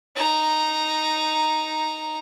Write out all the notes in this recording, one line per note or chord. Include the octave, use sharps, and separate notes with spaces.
D#4 A#5